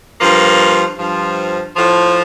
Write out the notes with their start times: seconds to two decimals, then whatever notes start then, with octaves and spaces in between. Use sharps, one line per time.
0.19 G2 F3 A#3
0.98 G2 F3
1.75 A2 F3